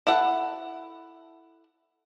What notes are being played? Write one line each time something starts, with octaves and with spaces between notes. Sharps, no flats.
E4 A4 F#5